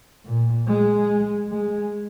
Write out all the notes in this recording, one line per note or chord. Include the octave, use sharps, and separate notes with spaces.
A#2
G#3
G#3